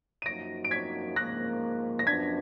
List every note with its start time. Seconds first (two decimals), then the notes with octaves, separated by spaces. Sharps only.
0.22 D#7
0.26 F#2 F3 A#3 D#4 F#4 A#6 D7
0.65 D7
0.71 G#6 B6
1.16 G#2 F3 A#3 F#6 A#6
1.99 A#6
2.07 F#2 F3 B3 D4 G#6 B6